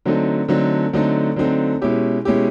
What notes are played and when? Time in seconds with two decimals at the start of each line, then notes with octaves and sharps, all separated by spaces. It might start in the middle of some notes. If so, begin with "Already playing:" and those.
0.06 D3 F#3 A3 C4 D#4
0.49 D3 F#3 A3 C4 D#4
0.93 D3 F#3 A3 C4 D#4
1.36 D3 F#3 A3 C4 D#4
1.82 B2 G#3 C#4 E4 G4
2.25 B2 G#3 C#4 E4 G4